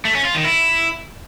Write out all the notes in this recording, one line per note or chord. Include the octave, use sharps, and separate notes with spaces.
A3
C#4
F4
D#3
E4